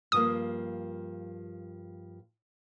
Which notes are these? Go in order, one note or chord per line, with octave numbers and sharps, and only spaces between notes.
G2 F3 A#3 D#6